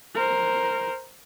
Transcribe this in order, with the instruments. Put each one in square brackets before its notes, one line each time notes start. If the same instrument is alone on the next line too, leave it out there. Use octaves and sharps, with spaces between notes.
[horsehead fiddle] A#4 C5